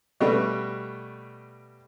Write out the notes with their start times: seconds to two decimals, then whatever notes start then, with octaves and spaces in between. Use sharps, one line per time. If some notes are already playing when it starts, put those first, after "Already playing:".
0.21 B2 G3 A3